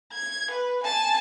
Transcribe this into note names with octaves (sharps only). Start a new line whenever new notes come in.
G#6
B4
G#5 A5